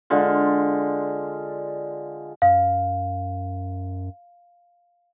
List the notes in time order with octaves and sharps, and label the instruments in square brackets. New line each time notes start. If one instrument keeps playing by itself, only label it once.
[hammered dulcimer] D3 G#3 F4
[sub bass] F#2 [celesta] F5